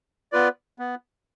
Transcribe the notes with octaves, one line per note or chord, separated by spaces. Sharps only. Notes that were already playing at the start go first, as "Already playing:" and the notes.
B3 F4 B4 D5
B3